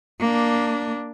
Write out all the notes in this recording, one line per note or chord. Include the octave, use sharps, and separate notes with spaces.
A#3 D4